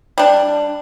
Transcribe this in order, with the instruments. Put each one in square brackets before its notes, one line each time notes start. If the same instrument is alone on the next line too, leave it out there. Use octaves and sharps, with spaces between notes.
[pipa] G3 D4